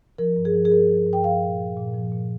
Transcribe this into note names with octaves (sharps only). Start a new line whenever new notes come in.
F3 A#4
G2
G#4
F3
G#4
G2 A#4
F3
G2
G5
F3 F5
A#2
F3
A#2
F3
A#2